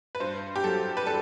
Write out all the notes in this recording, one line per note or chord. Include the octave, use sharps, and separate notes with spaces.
B4
G2 C5
G4
F#3 A4
B4
D4 A4